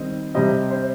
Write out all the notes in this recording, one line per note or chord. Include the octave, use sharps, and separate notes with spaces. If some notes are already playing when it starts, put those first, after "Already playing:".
Already playing: D#3 G3 C4 D#5
C3 G3 C4 D#5
C5